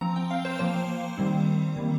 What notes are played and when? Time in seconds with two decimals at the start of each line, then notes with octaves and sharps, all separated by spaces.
0.01 F3 C4 A#5
0.16 G5
0.31 F5
0.45 C5
0.59 F3 A#3 C5
1.18 D#3 G3 C4
1.76 D#3 G3 A#3